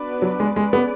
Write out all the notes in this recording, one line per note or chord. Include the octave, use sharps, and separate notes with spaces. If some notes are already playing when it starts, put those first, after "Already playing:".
Already playing: B3 D4 F#4 B4 D5
F#3
G#3
G#3 C#4 G#4 B4 D5
B3